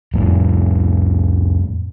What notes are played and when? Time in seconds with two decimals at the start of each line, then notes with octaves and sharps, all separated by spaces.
0.14 F2 A2